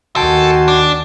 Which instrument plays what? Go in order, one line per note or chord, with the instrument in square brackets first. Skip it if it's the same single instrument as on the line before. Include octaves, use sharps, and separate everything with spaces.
[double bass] D#2 D#3 [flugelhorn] F#4 [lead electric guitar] A4 [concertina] G5 G#5 C6
[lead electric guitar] D4